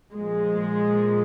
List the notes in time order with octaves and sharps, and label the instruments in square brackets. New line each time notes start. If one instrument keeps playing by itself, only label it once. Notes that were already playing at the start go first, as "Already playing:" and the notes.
[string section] A#2 F3 G#3